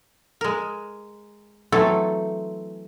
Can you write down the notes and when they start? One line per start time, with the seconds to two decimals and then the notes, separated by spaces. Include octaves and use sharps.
0.41 G#3 A#4
1.72 E3 F#3 A3 C4 A4